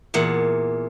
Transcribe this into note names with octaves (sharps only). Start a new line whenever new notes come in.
E2 A#2 F#5